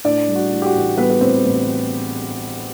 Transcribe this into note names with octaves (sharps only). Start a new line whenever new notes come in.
A2 D4 D5
G3
F#4
A2
G4
F#4
A1
G3 B3 B4
B4
A1 C4 C5
A1